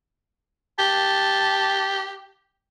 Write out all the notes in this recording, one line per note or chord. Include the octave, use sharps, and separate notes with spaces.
G4 A5